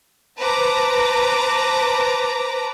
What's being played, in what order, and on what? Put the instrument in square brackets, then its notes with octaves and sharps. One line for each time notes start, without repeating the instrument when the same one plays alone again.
[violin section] B4 C5 A5 A#5 D6